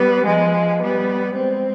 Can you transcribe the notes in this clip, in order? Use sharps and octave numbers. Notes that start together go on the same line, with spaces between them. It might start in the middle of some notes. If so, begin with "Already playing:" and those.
Already playing: G3 B3
F3 G#3
G3 B3
G#3 C4